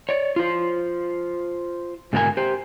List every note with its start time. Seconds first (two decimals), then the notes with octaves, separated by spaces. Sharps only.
0.09 C#5 D5
0.36 F4 C5
2.13 G#2 B2 D3 A#3 A#4 G#5
2.37 G4 C5